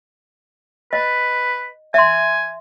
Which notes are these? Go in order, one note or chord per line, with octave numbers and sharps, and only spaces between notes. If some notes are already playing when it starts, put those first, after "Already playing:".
B4 D#5
E5 G#5 C6